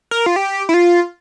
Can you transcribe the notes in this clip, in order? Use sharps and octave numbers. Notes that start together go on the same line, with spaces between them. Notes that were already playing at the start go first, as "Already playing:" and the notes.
A#4
F4
G4
E4
F4